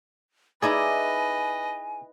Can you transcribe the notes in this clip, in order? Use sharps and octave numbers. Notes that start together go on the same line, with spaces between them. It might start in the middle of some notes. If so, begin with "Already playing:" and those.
D#4 E4 G#4 B4 D5 D#5 G#5